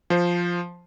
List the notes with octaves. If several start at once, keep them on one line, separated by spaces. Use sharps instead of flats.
F3 C5